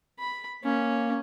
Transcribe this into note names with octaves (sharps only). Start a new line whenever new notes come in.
B5
A#3 C#4